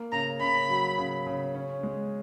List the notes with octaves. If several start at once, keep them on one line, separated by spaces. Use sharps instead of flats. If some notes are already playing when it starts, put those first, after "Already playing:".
Already playing: A#3
C#3 A#5
C#3 B5
F#3
C#3
C#3
C#4
G#3